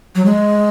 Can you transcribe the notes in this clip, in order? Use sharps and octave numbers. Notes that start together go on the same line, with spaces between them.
F#3
G#3